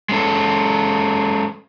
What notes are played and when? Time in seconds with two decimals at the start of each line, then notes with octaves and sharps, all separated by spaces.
0.09 G#3 C#4 A4